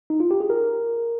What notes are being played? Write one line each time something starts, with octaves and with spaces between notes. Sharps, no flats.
D#4
F4
G4
G#4
A#4